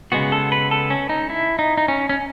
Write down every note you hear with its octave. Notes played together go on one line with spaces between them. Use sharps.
C#3 G#3 B3 F#4
A4
B4
A4
C#4
D#4
E4
D#4
D#4
C#4
C#4